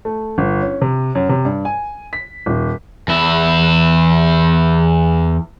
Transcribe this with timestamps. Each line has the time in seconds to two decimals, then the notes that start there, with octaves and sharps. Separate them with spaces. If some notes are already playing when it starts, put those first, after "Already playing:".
0.05 A3
0.38 G1
0.62 C#4
0.81 C3
1.15 F#2
1.29 C3
1.45 G2
1.65 G#5
2.13 B6
2.46 D#1
3.08 E2 E4